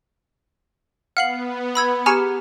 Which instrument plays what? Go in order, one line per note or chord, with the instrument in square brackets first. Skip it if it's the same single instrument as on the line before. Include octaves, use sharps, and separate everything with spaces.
[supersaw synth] B3 [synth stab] F5 [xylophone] F#5 C7 F#7
[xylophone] B5 E6 G#6
[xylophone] G4 A#5 F6 [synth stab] G#4 G#5 C#6